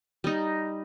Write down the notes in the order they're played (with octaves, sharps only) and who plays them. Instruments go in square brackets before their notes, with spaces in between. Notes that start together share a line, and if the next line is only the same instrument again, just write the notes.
[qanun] G3 D#4